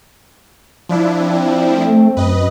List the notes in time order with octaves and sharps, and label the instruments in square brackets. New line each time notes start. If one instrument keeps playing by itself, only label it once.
[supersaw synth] F3 D4 E4
[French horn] C4
[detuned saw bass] A3
[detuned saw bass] F#2 [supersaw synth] B4 D#5